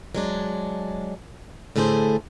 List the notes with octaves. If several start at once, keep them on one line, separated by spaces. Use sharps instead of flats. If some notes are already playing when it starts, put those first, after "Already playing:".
F#3 G#3 D4
A2 D3 A3 G#4 A#4 C5